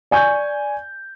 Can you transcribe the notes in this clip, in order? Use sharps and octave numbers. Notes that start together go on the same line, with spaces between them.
D5 G#5 C#6 G6